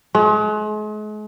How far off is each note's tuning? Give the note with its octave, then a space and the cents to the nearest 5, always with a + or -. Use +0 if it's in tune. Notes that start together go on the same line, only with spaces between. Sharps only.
G#3 +40